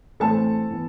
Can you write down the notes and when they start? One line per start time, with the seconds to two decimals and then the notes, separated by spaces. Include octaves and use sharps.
0.20 A2 E3 A3 C4 A4 A5
0.70 E3 B3